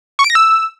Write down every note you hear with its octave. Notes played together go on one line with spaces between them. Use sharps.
C#6
D7
A#6
E6